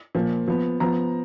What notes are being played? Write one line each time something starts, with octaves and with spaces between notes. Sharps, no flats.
A#2 F3 A#3
F3 B3
F3 B3 A#5